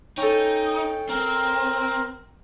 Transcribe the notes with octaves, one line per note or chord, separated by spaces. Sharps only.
C#4 D#4 A4 G5
C4 A#4